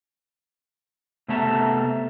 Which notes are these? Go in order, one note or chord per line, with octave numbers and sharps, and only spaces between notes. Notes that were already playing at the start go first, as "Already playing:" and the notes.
C3 A3 B3 E5 A5 A#5